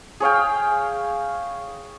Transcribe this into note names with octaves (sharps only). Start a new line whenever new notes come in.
G#4 C#5 F5 G5